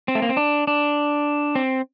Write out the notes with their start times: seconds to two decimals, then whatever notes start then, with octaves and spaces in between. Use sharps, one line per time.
0.08 C4
0.15 A3
0.22 A#3
0.29 C4
0.37 D4
0.67 D4
1.55 C4